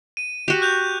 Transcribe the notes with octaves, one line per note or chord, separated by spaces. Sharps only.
D#7
F#4 G4
F#6 G6 F7